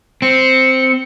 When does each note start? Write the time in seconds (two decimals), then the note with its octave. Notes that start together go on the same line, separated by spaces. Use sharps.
0.22 C4 C#7